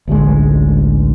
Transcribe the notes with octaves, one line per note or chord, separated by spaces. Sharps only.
A1 D2 D3 G#3